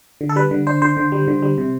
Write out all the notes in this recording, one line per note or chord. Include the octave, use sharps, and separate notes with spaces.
D3
A4
G3 B4
D3
D4 C5
D3 C5
D3
G3
D3
G3
C3